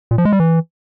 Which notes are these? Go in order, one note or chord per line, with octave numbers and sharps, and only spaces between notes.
A#2
F3
G#3
G3
E3